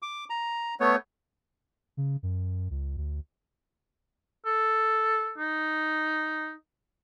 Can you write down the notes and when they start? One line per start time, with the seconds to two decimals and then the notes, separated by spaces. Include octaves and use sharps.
0.02 D6
0.30 A#5
0.80 A3 B3 C#5
1.97 C#3
2.23 F#2
2.70 C#2
2.97 D2
4.46 A4
5.38 D#4